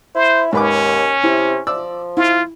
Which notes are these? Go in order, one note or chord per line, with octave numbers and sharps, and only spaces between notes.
E4 C5
D#2 G#2 C#4 B4 D6
C3 E4
F3 D5 E6
E4 F4